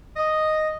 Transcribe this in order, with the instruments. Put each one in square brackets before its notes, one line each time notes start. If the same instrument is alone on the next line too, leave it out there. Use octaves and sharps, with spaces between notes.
[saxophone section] D#5